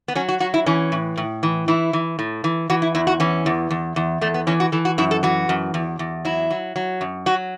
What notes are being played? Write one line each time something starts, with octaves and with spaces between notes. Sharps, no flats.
B3
F#3 C#4
F#4
F#3 F#4
E4
E3 C#4
A2
A2
E3
E3 E4
E3
A2
E3
E3 F#4
E4
E2 E4
F#4
E3 C#4
E2
E2
E2
E2 A3
B3
E3 C#4
F#4
E3 A4
F#4
F#2 E4
A4
E3 F#4
F#2
E2
E2
F#3 E4
F#3
F#3
F#2
F#3 F#4